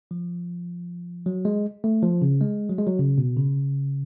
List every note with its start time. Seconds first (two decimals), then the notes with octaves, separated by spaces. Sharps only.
0.11 F3
1.26 F#3
1.45 G#3
1.84 A3
2.03 F3
2.22 C#3
2.41 G#3
2.70 F#3
2.78 G#3
2.86 F#3
2.99 C#3
3.18 B2
3.37 C#3